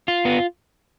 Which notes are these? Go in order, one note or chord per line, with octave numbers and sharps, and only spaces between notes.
F4
B3